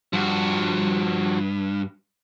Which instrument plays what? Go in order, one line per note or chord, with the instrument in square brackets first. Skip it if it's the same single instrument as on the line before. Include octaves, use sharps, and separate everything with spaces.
[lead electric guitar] G2 [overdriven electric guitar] F3 F#4